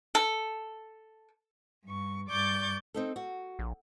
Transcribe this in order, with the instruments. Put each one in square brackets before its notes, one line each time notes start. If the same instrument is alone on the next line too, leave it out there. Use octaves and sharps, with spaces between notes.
[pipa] A4
[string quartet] G2 C#6
G2 D5 C#6 D6 G6 A6
[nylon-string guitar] C4 D#4 A4
F#4
[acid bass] A#1